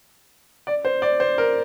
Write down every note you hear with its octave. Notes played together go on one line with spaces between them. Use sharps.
D5
C5
D5
C5
A#4